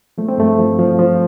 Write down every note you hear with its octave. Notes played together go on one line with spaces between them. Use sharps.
F3 A3
C4
G2 A3
F3
F3
F3